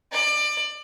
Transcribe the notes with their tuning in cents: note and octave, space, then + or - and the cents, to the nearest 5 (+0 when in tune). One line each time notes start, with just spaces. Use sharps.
D5 +25